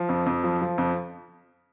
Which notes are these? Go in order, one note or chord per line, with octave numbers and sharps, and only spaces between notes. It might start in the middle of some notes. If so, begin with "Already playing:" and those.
Already playing: F3
F2
F2
F3
F3
F2